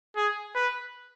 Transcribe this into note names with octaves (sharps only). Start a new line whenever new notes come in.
G#4
B4